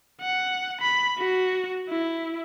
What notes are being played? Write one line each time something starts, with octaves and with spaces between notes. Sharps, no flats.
F#5
B5
F#4
E4